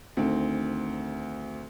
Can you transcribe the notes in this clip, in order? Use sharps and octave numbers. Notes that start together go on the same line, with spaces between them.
D2 D#3 C4